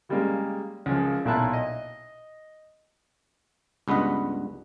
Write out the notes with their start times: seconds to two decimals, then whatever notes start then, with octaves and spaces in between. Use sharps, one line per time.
0.09 C#3 G3 G#3 A#3
0.86 C#2 F#2 F3
1.25 B1 A#2 E4 E5 A5 F#6
1.53 D#5
3.88 C#2 G2 B3 B4 D#5